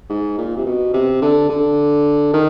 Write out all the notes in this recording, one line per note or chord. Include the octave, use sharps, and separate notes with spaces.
G#2
A#2
C3
B2
C3
D3
D3
D#3